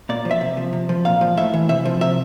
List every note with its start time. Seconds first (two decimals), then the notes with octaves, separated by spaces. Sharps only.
0.09 A#2 D5
0.25 F3
0.31 E5
0.41 C3
0.57 F3
0.73 C3
0.89 F3
1.05 A#2 F5
1.21 F3
1.37 A2 E5
1.53 E3
1.69 C3 E5
1.85 F3
2.01 C3 E5